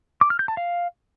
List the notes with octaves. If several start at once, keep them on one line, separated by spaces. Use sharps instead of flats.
D6
F6
G6
A5
F5